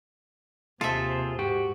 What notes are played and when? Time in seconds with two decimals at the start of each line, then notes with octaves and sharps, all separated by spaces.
0.81 D#2 C3 F4 G#4 A4 C5 E5
1.39 G#2 F#4 G4